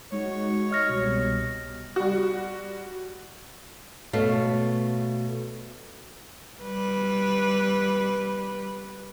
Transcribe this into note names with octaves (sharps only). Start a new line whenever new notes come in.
G#3 D#4 F#4 C#5
D#5 F6 A#6
C2 B2 G3
G3 F#4
B2 A3 C#5 F5
G3 B4